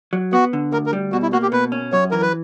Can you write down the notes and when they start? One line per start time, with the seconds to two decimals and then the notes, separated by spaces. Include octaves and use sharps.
0.13 F#3
0.33 B3 F#4
0.53 D3
0.72 D2 A#4
0.86 A#4
0.93 G3
1.12 B2 F#4
1.22 E4
1.33 A#3 F#4
1.42 G4
1.52 B2 B4
1.72 C#4
1.92 F#2 C#5
2.11 E3 A#4
2.22 B4